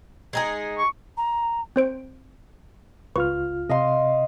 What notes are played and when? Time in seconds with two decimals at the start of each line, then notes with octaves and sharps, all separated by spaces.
0.33 G#3 D#4 G#4
0.78 C#6
1.17 A#5
1.76 C4 C5 D7
3.16 C#2 F4 B4 C#6 F6
3.69 C3 D#5 F5 C6